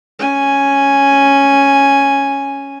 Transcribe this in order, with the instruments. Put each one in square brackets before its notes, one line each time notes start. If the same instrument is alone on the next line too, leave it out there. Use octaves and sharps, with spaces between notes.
[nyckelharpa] C#4 G#5